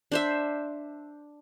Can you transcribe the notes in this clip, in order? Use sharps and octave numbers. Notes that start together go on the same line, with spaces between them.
D4 C5 E5